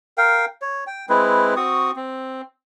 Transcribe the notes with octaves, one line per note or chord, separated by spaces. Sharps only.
A#4 F5 G5
C#5
G5
G#3 C4 E4 B4
C4 F#4 C#6 D#6
C4